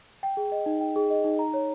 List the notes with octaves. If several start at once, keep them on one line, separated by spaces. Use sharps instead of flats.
G5
G#4
D#5
D#4
G5
G#4
D#5
D#4
A#5
C#5